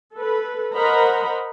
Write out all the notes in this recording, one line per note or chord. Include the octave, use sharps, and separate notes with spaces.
A4 B4
A#4 C5 D#5 F#5 A#5 B5